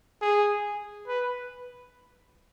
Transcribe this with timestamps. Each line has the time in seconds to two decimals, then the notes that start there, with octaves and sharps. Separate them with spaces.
0.22 G#4
1.08 B4